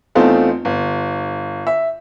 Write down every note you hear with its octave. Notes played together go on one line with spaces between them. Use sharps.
E2 A3 C4 D#4 F4
G1
E5